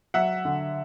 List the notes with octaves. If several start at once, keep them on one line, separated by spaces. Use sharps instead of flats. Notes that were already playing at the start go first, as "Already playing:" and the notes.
F#3 E5 F#5
D3